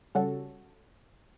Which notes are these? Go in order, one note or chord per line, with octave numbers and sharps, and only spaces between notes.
C#3 G3 C#4 F#4 A4